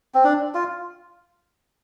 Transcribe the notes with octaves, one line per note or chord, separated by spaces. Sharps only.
C4
D4
F4